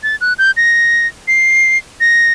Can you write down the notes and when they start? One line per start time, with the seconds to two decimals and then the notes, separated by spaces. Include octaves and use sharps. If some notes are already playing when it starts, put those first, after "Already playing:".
0.03 A6
0.21 F#6
0.38 G6
0.57 A#6
1.28 C7
2.00 A#6